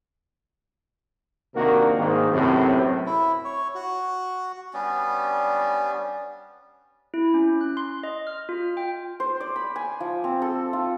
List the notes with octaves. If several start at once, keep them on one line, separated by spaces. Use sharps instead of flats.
C3 D#3 A#3 D4 F#4 A#4
G#2 D#3 A#3
F#2 A2 C3 B3 C4
E4
C#5
F#4
G3 B3 C#4 D4
E4
C#4
F#6
C6
D#5
F6
F4
G5
C5
D5
B5
G#5
F3
C4
A4
F4